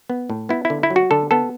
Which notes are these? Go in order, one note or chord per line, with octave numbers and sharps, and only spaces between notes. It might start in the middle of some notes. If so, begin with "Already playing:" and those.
B3
A2
B3 E4
E4
D3
E4
F#3
F#4
D3 A4
B3 A4